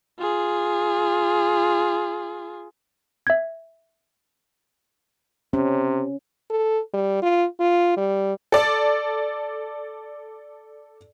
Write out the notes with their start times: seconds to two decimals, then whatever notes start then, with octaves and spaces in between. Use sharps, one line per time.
0.19 F4 G#4
3.27 E5 G#6
5.53 C3 C#4
6.50 A4
6.94 G3
7.22 F4
7.60 F4
7.97 G3
8.52 A4 D5